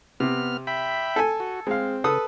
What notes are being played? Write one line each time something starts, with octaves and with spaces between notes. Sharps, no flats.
C3 B3 F6
E5 G5 B5
A4 G#5
F#4
G#3 C4 F5
C#3 A4 B4 D#6